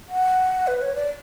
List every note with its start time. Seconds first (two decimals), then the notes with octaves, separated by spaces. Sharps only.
0.09 F#5
0.67 B4
0.82 C#5
0.95 D5